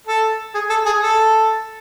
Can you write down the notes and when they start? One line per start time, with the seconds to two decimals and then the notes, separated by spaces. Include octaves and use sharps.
0.07 A4
0.55 G#4
0.70 A4
0.86 G#4
1.02 A4